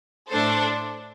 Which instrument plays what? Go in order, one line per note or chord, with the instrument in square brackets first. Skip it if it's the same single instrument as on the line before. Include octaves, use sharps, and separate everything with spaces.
[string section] A2 A3 D4 A4 C5